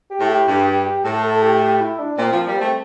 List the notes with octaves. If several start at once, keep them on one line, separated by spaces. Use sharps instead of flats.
G4
A2
G4
G2 G4
G4
G4
A2 A4
A4
G4
G4
E4
D4
A#2 C4
F3 A#3
G3
A3 C4